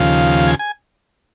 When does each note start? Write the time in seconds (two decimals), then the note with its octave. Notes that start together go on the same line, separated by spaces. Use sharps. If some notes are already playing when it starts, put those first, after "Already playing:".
Already playing: D#2 C#3 F3 F5
0.47 G#5
0.59 G#5